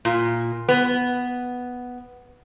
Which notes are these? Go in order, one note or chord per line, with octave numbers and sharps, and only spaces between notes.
A#2
B3